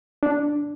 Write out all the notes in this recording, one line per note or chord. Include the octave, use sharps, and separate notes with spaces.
D4